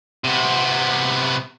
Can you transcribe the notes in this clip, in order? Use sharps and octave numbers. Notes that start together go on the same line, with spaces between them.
C3 B3